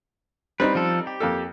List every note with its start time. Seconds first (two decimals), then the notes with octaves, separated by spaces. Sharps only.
0.60 G3 C4 D#4 B4
0.75 F3 A4
1.07 G4
1.20 F2 A#3 A4